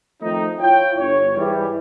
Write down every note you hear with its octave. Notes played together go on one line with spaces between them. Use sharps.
D#3 F3 A3 C4 D#4
E4 F4 C#5 G5
G1 C#5
G#2 E3 G3